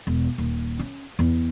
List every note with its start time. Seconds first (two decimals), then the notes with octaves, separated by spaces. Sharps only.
0.07 E1
0.38 D#1
0.79 C#4
1.19 E2